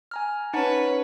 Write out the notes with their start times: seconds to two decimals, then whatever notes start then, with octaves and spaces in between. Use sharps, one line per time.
0.11 G#5 A#5 F6
0.54 C#4 D#4 B4 F#5 A5